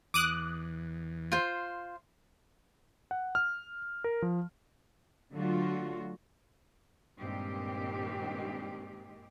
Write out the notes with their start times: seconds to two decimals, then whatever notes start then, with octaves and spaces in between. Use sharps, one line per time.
0.14 E2 D6 D#6 F#6
1.32 F4 C5
3.11 F#5
3.35 F6
4.04 A#4
4.22 F3
5.34 D3 F#3 A3 F4 F#4
7.18 G2 A#2 D#3 G#3 C4 G4